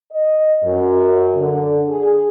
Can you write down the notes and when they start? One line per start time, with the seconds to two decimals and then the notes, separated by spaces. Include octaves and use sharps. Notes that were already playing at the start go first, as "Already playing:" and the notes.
0.11 D#5
0.64 F#2
1.35 D3
1.88 G#4